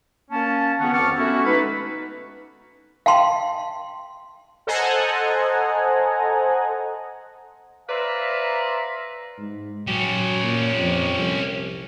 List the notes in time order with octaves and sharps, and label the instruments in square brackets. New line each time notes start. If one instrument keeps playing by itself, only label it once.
[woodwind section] A#3 C#4 A5
C#2 D#3 B3 C#4 F#5
F2 C4 A5 C#6 D6 F6
A3 B3 C#4 E4 F#4
B2 G#3 D#4 B4
[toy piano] F5 G5 A5 C6
[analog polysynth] A4 C5 D#5 F#5 G#5 A#5
[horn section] B4 C5 D5 E5 F5 A#5
[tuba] G#2
[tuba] F#3 [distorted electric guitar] C#4 G4
[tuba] A#2
F2
C2